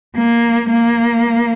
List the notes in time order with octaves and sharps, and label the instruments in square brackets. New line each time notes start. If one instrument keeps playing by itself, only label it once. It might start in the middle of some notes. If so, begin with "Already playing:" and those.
[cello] A#3
A#3